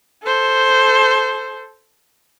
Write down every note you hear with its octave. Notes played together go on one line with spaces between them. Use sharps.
A4 C5